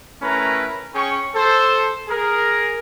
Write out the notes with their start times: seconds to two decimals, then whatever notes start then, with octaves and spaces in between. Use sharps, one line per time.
0.22 A3 C#4 E4 A#4 B4 A#5
0.95 C#4 G#4 G5 C#6
1.35 A4 C5
2.08 G#4 A#4